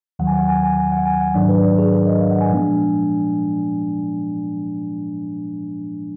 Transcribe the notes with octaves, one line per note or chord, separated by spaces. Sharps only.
D#2 D#3 F#3 F#5
G#5
F#5
G#5
G#5
G#5
F#5
G#5
F#5
G#2 D#3 F#3 D4 D5
B4
D5
G#4
A#4
D#5
F5
F#5
G#5
A#2 F3 G#3 B3 D4